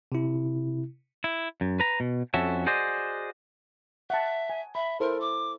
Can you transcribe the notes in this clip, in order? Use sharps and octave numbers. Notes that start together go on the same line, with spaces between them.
C3 E4
E4
F#2
B4 A#5
B2
F2 C#4 F#4 A4 E5
F#4 G#4 C5 D5 D#5
E5 F#5 A5
G#5
E5 B5
E4 A4 A#4 C5
D6